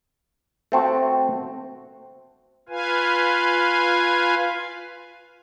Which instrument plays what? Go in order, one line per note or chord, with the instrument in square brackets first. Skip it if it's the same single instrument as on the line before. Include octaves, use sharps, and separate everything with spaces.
[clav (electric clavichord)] A3 C4 F#4
[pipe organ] F4 B4 F5 G#5